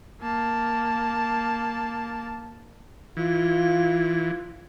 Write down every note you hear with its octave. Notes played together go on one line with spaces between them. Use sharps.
A#3 A5
E3 F4